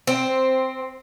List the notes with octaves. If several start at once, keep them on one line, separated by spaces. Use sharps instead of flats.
C4